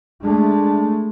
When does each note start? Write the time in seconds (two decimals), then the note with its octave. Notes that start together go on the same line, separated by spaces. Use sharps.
0.23 G#3 A3 D4